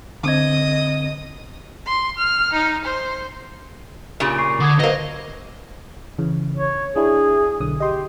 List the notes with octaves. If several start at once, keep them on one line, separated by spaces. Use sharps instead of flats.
D3 C4 D#5 D#6 G#6
C6
F6
D#4
C5
A#2 C#3 F4 G4 F7
C#6 C7
D3 D6 D#6 G#6
F#3 A#3 B4 C5 D#5
C#3 E3
C#5
D4 E4 G#4
B1 D3 D#6
G4 D#5 C6